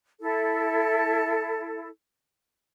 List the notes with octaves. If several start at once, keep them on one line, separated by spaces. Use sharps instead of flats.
E4 A4